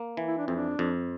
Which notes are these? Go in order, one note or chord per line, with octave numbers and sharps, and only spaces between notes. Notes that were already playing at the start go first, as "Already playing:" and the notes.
Already playing: A#3
E3
E4
D4
F2 C4
D4
F2